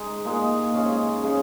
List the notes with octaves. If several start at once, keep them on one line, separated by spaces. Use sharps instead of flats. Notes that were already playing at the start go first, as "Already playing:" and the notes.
Already playing: G#3 D#4 G#4
A#2 G#3 D#4 G#4
C#3 G#3 C#4 G#4
C#3 G#3 C#4 G#4